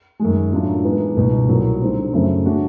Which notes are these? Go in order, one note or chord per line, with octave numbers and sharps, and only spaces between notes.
F#2 D#3 G#3
A2 F#3 A3 D4 F4
E3 G#3 B3 D#4
C#2 B2 G3 B3 D#4
C2 A#2 F#3
D3 G3 C4 D#4
F#2 C#3 F#3 A3 C4
C#3 F#3 A3 D4 F#4